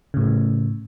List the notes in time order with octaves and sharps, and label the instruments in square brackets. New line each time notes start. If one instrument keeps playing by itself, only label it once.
[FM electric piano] A2 C#3